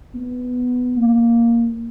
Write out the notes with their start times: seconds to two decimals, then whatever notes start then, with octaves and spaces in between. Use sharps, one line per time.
0.15 B3
0.96 A#3